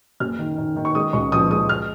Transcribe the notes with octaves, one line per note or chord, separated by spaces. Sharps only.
F#1 F6
D#3
D#3
D#3
C#6
G#3 D#6
C#2 C#6
F3 D#6
G#3 D#6
F6